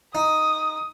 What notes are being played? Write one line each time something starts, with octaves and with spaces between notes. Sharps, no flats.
D#4 D#6